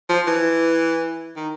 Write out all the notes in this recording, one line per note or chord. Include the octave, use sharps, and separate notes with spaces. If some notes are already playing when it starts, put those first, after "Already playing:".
F3
E3
D#3